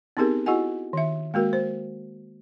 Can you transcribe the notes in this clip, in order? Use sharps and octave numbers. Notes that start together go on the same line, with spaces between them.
B3 C4 D#4 G4 G#4 A#4
E4 F#4 G#4 D#5 F#5 G#5
D#3 E5
G#3 A#3 F#4 A#4
C5